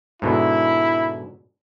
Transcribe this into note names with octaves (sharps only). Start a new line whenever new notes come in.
G#2 B2 D3 E4